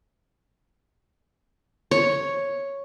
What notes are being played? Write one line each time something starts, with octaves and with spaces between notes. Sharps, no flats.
C#5